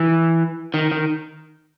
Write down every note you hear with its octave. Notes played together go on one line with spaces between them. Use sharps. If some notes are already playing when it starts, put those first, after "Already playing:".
Already playing: E3
D#3
D#3